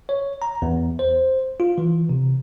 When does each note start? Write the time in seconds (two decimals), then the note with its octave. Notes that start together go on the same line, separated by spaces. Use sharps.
0.09 C#5
0.42 A#5
0.62 E2
0.99 C5
1.60 F4
1.78 E3
2.09 C3